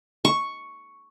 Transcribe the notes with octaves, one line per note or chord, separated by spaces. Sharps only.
C#6